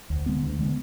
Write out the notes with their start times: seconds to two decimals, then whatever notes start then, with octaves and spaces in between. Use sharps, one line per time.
0.10 D2
0.26 D3 G#3 B3
0.43 D2
0.59 D3 G#3 B3